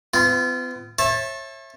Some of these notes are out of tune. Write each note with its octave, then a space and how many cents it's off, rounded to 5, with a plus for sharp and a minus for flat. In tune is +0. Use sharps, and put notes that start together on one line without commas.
B3 +45 F4 -25
C#5 -35 E5 +0 A5 +0